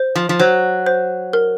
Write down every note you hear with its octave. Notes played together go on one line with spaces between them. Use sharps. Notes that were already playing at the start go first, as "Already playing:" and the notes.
Already playing: C5
F3
F3
F#3 C5
C5
A#4